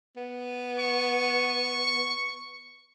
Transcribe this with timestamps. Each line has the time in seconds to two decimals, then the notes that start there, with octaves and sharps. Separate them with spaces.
0.17 B3
0.79 C#6